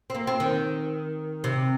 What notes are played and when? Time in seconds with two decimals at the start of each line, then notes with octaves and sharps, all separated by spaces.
0.10 C4
0.15 A#3
0.27 C4
0.40 D#3
1.44 C3